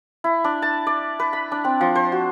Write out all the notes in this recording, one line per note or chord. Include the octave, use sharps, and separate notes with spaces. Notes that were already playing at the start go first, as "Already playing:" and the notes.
E4
D4
A5
D5
B4
B5
D4
C4
F3
C5
F#4